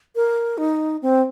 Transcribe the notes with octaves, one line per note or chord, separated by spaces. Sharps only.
A#4
D#4
C4